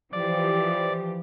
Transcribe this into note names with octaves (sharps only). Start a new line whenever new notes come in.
E3 F3 G4 D5